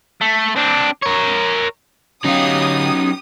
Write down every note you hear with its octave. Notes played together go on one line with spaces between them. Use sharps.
A3
C4 D4
A#4 C#5
D3 F#3 C#4 D#4 G4 F5 D#6